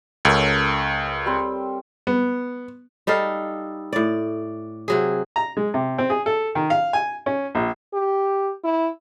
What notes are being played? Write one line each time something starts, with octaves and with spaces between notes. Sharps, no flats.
C#2 C#4 A4 A#4
G3 C4 C6
B3
G3 D#4 A4 F5
A2 D5
C3 F#3 G#4
A#5
G#3
C3
C4
G#4
A4
D#3
F5
G#5
C#4
A#1
G4
E4